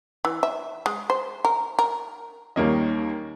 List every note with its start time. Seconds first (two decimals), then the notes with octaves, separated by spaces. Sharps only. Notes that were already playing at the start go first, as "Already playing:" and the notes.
0.25 E3
0.43 E5
0.86 G#3
1.10 C5
1.45 A#4
1.79 A#4
2.56 D#2 D#3 G3 A#3 C#4 D#5